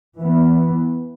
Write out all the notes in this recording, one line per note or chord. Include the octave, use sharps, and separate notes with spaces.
E3 B3